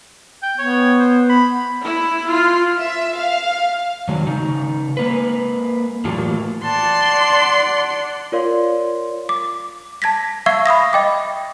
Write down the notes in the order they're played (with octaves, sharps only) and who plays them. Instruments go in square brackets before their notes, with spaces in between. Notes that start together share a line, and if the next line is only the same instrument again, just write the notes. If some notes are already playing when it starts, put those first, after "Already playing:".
[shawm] G5
[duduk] B3 [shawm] C#5
[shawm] C5
B5
[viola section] E4
F4
[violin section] E5
F5
[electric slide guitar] D#3 F#3 G#3
C#3 D#4
G#3 A#3 B4
A2 E3 F#3 A#3 F4 G4
[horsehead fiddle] D5 F#5 [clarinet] A5 [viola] C6
[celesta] F4 A#4 C#5 D5 F5 C6
[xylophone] D6
A5 G#6 A#6 B6
E5 F5 C#6 E6 G#6 C7
B5 C#6 D#6 A#6
D#5 G5 D6